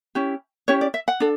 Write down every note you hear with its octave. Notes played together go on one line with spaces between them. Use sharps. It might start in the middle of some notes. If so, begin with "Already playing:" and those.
C#4 E4 G4
C#4 E4 G4 C#5
D5
E5
F#5
D4 A4